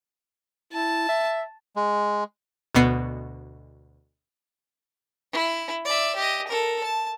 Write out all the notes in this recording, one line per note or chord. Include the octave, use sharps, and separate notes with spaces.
E4 A5
E5
G#3
D2 B2 B3 C7
E4
D5 E5
G4 D#5
A4 A#4
A5